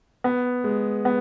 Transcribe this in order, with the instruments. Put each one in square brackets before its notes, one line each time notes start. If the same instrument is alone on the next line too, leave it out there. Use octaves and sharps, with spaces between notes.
[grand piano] B3
G#3
B3